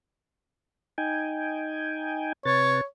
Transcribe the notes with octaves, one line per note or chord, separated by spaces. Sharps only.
D#4 G5 G#5
C3 B4 C#5 A6